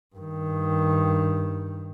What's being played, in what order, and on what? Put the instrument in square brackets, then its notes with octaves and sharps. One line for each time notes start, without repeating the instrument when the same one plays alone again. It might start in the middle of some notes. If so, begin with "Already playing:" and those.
[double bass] G2 D#3